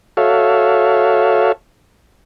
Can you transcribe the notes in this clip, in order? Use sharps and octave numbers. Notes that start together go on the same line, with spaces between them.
F#4 A4 C#5 E5 F5